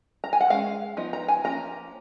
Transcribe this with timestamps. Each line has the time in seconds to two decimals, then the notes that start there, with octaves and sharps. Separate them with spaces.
0.24 A#5
0.33 G#5
0.41 F#5
0.50 G#3 C#4 F5
0.97 F3 B3 D#4
1.13 A#5
1.28 G#5
1.44 F3 A#3 C#4 A#5